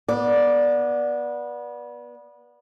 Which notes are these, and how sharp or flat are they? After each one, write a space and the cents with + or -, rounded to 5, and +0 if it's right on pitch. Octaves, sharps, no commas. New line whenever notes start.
B3 -25 D5 +0